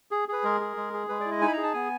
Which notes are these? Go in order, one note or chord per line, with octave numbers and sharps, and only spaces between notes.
G#4
G#4 B4
G#3 A#4
G#4
G#3
G#4
G#3 B4
D5
E4
D#5
D#4 G#5
B5
G#4 A#5
A5
B3 G#5